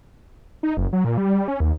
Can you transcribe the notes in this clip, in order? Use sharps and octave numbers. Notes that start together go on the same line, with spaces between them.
D#4
F#1
F#3
A#2
G3
G3
C#4
D#2